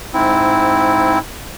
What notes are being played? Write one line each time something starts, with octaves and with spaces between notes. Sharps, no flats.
G#2 C4 E4